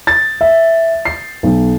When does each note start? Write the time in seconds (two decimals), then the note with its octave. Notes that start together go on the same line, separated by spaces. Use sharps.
0.07 A6
0.41 E5
1.05 C7
1.43 B1